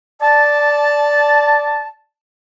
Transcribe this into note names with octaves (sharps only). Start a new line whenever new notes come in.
D5 A5